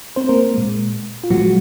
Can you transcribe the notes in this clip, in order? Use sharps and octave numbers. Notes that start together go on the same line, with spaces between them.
C4 C5
A#3 A#4
A#2 G#3
F4
A#2 F3 F#3 G#3 F#4